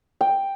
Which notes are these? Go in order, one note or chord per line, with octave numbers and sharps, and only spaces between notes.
G5